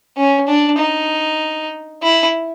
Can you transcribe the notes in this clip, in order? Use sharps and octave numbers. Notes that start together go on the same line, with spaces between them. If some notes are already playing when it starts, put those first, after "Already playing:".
C#4
D4
D#4
E4